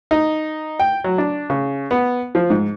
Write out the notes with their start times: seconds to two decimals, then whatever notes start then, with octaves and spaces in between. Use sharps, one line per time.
0.11 D#4
0.80 G5
1.04 F#3
1.18 D4
1.50 C#3
1.91 B3
2.35 F3
2.50 G#2